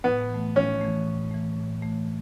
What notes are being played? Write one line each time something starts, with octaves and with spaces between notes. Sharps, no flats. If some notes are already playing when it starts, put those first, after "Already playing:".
A2 B3
E3 A3
A2 C#4
E3 A3
A2
E3 A3
A2
E3 A3